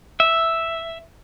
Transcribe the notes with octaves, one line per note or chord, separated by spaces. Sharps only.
E5